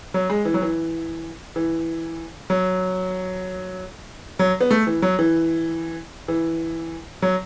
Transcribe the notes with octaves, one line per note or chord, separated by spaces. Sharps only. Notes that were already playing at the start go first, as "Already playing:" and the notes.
F#3
G#3
E3
F#3
E3
E3
F#3
F#3
B3
A3
E3
F#3
E3
E3
F#3